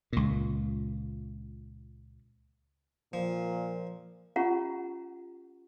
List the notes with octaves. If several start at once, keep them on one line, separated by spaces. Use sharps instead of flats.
C#2 A#2
A#2 F3
C#4 F4 G4 F#5 A#5 C#6